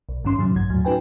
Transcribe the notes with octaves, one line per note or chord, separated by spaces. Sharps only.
B1
A1 G2 D#3 C#4 C6
F2 A2 C3 D#3 F#3
A#1 G2 G#6
D#2 A2 F#3
C#4 D#4 F#4 B4 G5 G#5